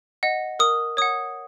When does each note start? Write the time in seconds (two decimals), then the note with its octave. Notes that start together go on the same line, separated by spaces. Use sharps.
0.23 D#5 F#5
0.59 A#4 D#6
0.97 C#5 F#5 D#6